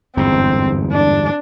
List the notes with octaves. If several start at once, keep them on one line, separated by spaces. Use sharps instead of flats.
G1 E2 G#2 C4
D4